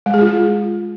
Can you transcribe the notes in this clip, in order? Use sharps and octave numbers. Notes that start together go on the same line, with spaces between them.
G#3
G#4
F4